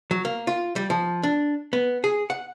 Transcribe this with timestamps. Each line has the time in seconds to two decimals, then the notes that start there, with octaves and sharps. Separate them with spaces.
0.11 F#3
0.25 A#3
0.47 F4
0.76 G3
0.90 F3
1.23 D4
1.73 B3
2.04 G#4
2.30 F#5